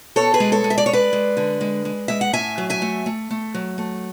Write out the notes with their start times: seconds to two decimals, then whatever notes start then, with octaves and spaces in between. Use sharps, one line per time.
0.16 B2 A4 C#5
0.34 G#4 B4
0.40 G#3
0.52 A4 C#5
0.64 G#3
0.70 E5
0.78 D5
0.86 G#3 C#5
0.93 B4 D5
1.13 G#3
1.37 D3
1.61 G#3
1.85 G#3
2.08 G#3 E5
2.21 F#5
2.33 A2 E5 G#5
2.58 F#3
2.70 E5 G#5
2.82 A3
3.06 A3
3.30 A3
3.54 F#3
3.78 A3